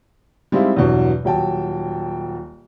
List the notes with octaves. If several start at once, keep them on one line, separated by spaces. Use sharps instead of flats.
G3 G#3 C4 D#4 E4 F5
E2 G2 B2 F#3
D#1 F#3 G5 A5